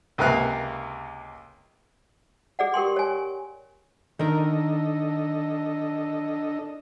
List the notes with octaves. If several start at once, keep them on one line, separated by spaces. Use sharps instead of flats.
C#2 C3 A#3 B4 F5 F#6
G#4 D5 F#5
G4 A#4 G5 C6
C#5 G#5
D#3 D4 A4 A#4 D#5